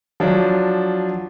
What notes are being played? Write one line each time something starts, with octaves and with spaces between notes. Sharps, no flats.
F3 F#3 D4